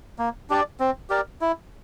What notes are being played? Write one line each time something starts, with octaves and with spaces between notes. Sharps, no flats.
A#3
D4 G4 D5
C4
G4 A#4 D5
E4